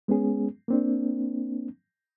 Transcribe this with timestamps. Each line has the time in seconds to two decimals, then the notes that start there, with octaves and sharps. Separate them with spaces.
0.08 G#3 B3 C#4 G#4
0.68 A#3 C4 D4